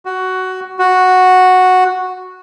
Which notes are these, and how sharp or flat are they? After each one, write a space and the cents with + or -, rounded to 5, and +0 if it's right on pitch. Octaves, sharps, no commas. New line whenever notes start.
F#4 +10
F#4 -5